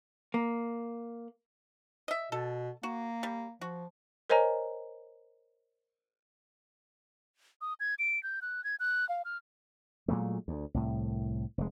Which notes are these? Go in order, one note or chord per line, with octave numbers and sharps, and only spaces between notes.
A#3
D#5 E5
B2 A4
A#3 F#4
G3
F3 F#4
A#4 C5 C#5 D#5 G#5 A#5
D#6
G#6
D7
G6
F#6
G#6
F#6
F5
F6
A#2 F#3 G#3 A3
D2
C2 A2
F1 G#3